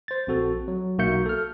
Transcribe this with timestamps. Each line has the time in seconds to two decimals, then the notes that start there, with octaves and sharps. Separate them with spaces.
0.08 C5 A6
0.27 A#1 C4 F#4 A4
0.68 F#3
0.98 B1 A#3 F#4 E5 G6 C#7
1.26 A4 F6